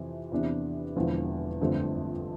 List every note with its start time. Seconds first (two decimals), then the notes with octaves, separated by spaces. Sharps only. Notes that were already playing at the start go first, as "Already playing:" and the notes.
Already playing: F2 C3 E3
0.32 E2 C3 E3 B3 D4
0.96 E1 E2 D3 F3
1.60 G1 F2 D3 A3 C4